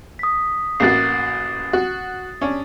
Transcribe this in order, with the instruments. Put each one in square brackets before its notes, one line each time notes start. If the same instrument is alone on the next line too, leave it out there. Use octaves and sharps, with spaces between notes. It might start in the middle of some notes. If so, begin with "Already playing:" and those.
[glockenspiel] D#6 B6
[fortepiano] A1 A#3 F#4 [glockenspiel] A6 C7
[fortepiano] F#4
C#4 D4